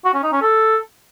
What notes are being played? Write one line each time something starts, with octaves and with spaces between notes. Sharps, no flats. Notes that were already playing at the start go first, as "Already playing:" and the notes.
F#4
C#4
D#4
C#4
A4